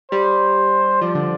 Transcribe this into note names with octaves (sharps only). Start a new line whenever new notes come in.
G3 C5
F3 D5
D3